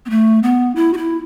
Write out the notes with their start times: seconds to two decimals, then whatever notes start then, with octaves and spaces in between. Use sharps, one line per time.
0.06 B3
0.10 A3
0.43 B3
0.76 E4
0.93 F#4
0.97 E4